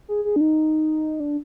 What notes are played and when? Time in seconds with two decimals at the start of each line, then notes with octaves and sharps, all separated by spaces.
0.08 G#4
0.25 G#4
0.36 D4
0.41 D#4
1.20 D4